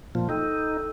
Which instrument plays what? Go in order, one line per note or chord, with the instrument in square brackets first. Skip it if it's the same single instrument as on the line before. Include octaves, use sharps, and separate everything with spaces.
[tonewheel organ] A#2 F3
[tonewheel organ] D#4 [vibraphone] A4 G5 E6